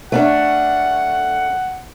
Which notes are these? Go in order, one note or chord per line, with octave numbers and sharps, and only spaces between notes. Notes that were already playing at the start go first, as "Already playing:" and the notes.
A3 C#4 D4 F#5